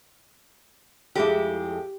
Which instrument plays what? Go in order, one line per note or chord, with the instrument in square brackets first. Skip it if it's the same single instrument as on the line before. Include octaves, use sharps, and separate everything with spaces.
[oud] F2 G#3 E4 [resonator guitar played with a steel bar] G4